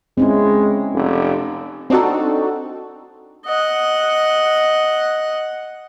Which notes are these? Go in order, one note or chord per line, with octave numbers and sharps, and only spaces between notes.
G#3 C4 C#4 E4
F1
C4 D4 D#4 F#4 A4
D#5 F#5